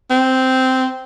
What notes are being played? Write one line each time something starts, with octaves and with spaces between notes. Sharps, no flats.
C4